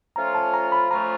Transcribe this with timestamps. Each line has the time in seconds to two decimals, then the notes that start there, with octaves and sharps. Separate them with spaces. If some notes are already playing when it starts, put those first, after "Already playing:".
0.16 F3 A3 C#4 F4 A#5
0.35 A5
0.54 A#5
0.72 B5
0.91 F3 A3 C#4 F4 A#5